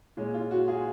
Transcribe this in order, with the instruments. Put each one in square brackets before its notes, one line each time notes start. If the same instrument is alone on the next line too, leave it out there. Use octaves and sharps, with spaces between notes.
[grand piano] A#2 G#3 C#4
F4
F#4
F4 G#4